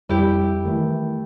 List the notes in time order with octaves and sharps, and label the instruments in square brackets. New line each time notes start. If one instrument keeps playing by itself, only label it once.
[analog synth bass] F2 [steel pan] G3 [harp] E4 G4
[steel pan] D#3 E3 [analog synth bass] A3